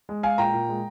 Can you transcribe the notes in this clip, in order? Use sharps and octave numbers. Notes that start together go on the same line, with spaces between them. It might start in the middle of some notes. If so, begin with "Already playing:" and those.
G#3
G#3 F5 G#5
A#2 G5 A#5
A#2
G#3